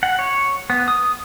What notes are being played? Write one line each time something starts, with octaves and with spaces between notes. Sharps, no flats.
F#5
C#5
B3
D#6